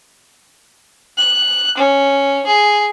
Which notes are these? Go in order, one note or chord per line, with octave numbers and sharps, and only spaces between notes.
F#6
C#4
G#4